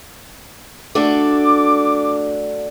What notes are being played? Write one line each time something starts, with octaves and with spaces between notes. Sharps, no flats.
A3 D4 F#4 D6